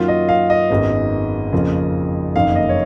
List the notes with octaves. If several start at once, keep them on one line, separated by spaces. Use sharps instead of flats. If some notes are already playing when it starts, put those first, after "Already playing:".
Already playing: F#2 D#3 F#3 A#3 F4
D#5
F5
D#5
G#1 F#2 D#3 G#3 B3
F2 C#3 F3 A#3
F#1 F2 D#3 A#3 F5
D#5
C#5